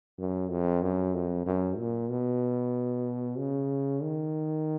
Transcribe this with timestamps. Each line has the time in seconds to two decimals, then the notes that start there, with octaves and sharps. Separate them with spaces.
0.18 F#2
0.50 F2
0.82 F#2
1.15 F2
1.46 F#2
1.78 A#2
2.10 B2
3.38 C#3
4.02 D#3